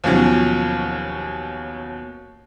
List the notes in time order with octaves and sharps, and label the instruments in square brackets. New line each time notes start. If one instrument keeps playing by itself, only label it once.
[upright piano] D#2 B2 F3 F#3 C#4